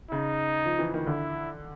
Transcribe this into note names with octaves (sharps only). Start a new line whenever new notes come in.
C#3 D#4
F3
E3
D#3
D3 E4